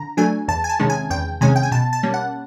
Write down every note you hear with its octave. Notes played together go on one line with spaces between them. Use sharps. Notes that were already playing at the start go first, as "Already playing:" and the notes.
Already playing: D3 A#5
F#3 A3 D4 G#5
E2 A5
G#5
A5
C3 D#3 G#3 C#4
G#5
E2 G5
C3 D#3 G#3 C#4 G#5
G5
G#5
B2 A5
A5
G3 A#3 C#4
F#5